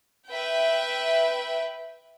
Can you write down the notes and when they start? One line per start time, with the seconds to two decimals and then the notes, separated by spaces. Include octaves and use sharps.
0.30 B4 E5 G5